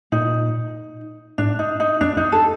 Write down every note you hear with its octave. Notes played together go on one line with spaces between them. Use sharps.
A#2 D#4
A2 D4
D#4
D#4
F#2 D4
F#2 D#4
A4